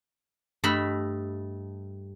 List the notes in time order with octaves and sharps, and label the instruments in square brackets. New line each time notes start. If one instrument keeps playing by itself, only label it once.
[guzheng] G2 A3 D#5 E5 B5